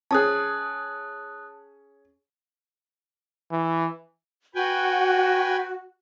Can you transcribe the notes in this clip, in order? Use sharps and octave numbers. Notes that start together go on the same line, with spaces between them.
C#4 G#4 A5 D#6 F#6
E3
F#4 B4 G5 G#5